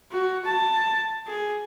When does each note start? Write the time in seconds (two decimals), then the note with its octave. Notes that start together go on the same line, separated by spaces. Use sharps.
0.11 F#4
0.45 A5
1.27 G#4